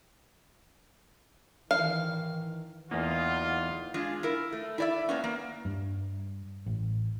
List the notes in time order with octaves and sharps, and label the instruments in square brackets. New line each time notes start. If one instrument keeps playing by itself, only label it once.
[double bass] D#3 E3 [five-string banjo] F5
[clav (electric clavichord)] E2 A#3 [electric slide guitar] E3 B3 D#4 [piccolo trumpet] F4
[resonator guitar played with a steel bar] G#3 D4 F4 G#4
E4 A#4
A3
E4 D5 E5
A#3 B3 C#4
A#3
[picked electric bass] G2
A1